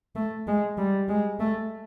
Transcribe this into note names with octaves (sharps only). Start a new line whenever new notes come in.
A3
G#3
G3
G#3
A3